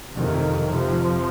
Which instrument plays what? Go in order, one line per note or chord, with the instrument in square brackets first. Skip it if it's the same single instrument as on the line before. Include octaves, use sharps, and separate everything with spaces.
[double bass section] F2 C3 D#3
F2 C3 F3